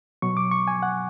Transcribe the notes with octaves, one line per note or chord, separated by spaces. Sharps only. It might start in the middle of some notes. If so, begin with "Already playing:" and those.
B2 F#3 C#6
D6
C#6
G#5
F#5